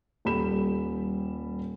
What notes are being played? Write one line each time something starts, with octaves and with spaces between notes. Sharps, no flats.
D#1 G3 B5 E7